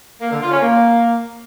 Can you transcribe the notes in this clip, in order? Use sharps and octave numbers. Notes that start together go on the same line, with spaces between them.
A#3
D3
F4
C#4
A#3